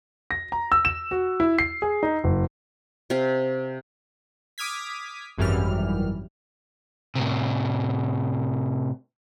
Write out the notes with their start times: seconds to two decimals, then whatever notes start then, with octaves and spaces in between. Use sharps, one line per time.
0.31 A#6
0.52 A#5
0.72 E6
0.85 E7
1.11 F#4
1.40 E4
1.59 C7
1.82 G#4
2.03 D#4
2.24 F#1
3.10 C3 F5
4.58 D6 D#6 F6 G#6 B6
5.38 G#1 F#2 E3 G3 F6
7.15 A2 C3